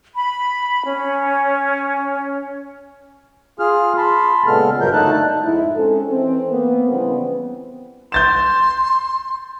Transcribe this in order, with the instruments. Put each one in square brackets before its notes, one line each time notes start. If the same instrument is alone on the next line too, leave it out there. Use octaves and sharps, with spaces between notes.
[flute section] B5
C#4
[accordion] F4 G#4 F6
A5 B5 C6
A#2 C#3 G#3 B3 A4 F6
G2 C#3 F3 F#3 A#4 G6
D3 A3 D#4 A5 F#6
[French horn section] F2 G#2 D#4 E4
G#3 C4 C#4 A4
E3 C4
A#3 B3
C#3 E3 F3 G3 B3 C4
[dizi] C6 [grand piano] G6 A6 E7